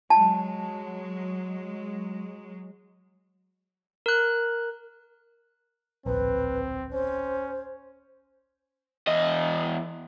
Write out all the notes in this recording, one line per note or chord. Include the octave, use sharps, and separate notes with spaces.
F#3 G#3 A5
A#4 F#6
D1 A#1 C4 B4
C#4 C5
E2 D#5